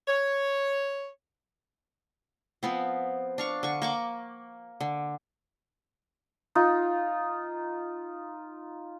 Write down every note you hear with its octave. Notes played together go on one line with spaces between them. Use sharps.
C#5
F3 B3 C4
D4 F5 C#6
D3 C#6
A#3 C#6 D6
D3
D#4 F4